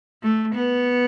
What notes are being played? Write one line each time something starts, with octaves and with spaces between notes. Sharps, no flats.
A3
B3